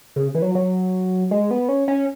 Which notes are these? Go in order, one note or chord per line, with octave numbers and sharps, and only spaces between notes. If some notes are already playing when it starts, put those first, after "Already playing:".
C#3
E3
F#3
F#3
G#3
B3
C#4
C#4